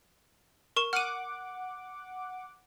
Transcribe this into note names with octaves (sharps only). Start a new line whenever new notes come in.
A#4 C#6 E7
F#5 D6 F6 D#7